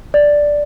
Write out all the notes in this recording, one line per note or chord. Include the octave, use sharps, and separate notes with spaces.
D5